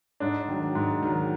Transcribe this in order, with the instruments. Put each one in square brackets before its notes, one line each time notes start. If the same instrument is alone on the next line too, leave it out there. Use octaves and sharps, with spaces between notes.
[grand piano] G#2 [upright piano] D4
[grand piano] D#3 F#3
G#2
D#3 F#3